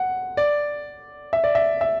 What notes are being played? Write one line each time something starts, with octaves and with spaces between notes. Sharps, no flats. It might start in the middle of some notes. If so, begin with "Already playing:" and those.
Already playing: F#5
D5
E5
D5
E5
E5